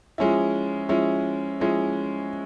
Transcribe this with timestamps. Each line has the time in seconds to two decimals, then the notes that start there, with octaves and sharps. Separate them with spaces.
0.18 F3 G#3 C#4 E4
0.89 F3 G#3 C#4 E4
1.60 F3 G#3 C#4 E4